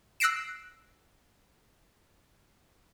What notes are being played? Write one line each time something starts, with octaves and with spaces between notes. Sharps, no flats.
E6 F#6 A#6 C7 D7 E7